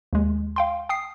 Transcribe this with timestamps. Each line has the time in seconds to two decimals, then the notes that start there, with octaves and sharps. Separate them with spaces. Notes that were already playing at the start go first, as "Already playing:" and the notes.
0.13 D#2 G#3
0.56 F5 G5 C6
0.89 G5 D#6 C7